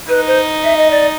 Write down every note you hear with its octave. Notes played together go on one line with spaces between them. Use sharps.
D#4 B4
C5
E5
D#5
D5